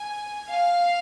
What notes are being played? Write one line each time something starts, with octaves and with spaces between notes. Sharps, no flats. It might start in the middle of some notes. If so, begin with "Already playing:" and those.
Already playing: G#5
F5